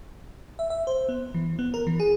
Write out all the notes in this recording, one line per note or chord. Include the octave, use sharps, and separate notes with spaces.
E5
E5
C5
B3
E3
B3
A#4
E3
G#4